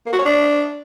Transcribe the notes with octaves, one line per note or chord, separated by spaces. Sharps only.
A#3
F#4
C#5
D4